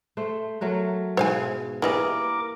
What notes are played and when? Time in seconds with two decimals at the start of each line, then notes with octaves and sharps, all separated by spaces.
0.17 A3 C5
0.61 F#3 A3 A#4
1.17 G#2 B2 E3 C5 F5 G#5
1.82 E3 G3 A#3 G#4 A#4 D#5 D6